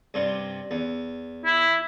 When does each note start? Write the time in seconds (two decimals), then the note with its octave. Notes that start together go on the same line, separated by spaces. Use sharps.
0.14 G2 C3 G3
0.71 E2
1.45 E4